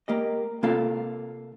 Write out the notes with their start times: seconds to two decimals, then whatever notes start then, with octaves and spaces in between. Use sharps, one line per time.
0.08 A#3 G4 D#5
0.63 C3 A#3 F4 A4 F5